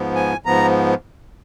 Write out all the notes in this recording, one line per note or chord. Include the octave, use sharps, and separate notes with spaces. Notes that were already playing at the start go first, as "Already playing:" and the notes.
Already playing: G#2 F3 B3
G#5
G#2 F3 B3 A#5